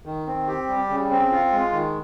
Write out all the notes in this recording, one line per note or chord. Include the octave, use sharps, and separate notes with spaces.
D#3
C4
G4
G3
C#3
C4
F4
G#3
D#3